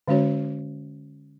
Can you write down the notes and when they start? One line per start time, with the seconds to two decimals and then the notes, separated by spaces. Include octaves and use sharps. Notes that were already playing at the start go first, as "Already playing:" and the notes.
0.08 D3 G#3 C#4 F#4 C#5